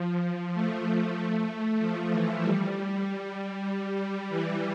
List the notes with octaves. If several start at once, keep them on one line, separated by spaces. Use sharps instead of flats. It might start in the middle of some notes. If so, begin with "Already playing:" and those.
Already playing: F3
A3
F3
E3
G3
G3
G3
E3